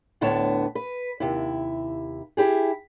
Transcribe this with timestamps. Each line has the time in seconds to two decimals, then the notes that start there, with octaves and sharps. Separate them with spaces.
0.21 D2 A2 D3 B3 C#5 A5
0.75 B4
1.20 D#2 C3 E4
2.37 E4 G4 G#4